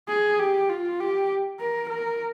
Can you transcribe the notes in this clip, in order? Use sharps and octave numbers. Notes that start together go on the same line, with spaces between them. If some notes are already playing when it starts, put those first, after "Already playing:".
G#4
G4
F4
G4
A#4
A#4